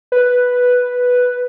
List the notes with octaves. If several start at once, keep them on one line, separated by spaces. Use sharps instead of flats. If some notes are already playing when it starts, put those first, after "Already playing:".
B4